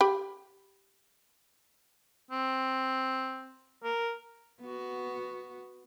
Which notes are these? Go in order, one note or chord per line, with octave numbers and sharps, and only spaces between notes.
G4 B5
C4
A#4
B3 F#4